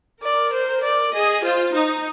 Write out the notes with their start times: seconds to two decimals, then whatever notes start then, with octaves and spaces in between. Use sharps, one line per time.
0.22 A#4 D5
0.53 C5
0.83 D5
1.13 G#4 D#5
1.44 F4 C5
1.74 D#4